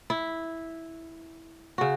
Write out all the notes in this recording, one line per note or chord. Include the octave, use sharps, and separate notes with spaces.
E4
C#3 F#4